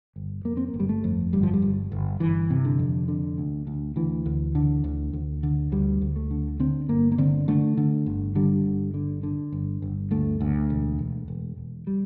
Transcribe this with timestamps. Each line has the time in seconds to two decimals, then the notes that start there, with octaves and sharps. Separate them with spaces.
0.16 G1
0.45 F2 A#3
0.57 C4
0.68 A#3
0.74 G1
0.80 G3
0.89 A3
1.04 F2
1.33 G1 G3
1.43 F3
1.53 G3
1.62 G1
1.92 G1
2.20 G1 E3
2.50 C3
2.65 D3
2.79 F2
3.08 D3
3.38 D2
3.67 D2
3.96 D2 E3
4.26 D2
4.55 D3
4.84 D2
5.13 D2
5.43 D3
5.72 D2 G3
6.02 D2
6.16 A3
6.30 D3
6.60 D3 C4
6.89 G1 A#3
7.12 A#3
7.18 D3 C4
7.48 D3 A3
7.77 D3
8.06 G1
8.35 D3 G3
8.65 G1
8.94 D3
9.23 D3
9.52 G1
9.82 G1
10.11 D2 A3
10.41 D2
10.70 E1
10.99 E1
11.28 E1
11.57 E1
11.87 G3